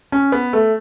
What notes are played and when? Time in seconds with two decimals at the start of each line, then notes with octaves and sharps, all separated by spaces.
0.12 C#4
0.32 B3
0.53 A3